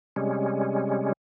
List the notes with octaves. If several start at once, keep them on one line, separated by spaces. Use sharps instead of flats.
C3 G3 G#3 C#4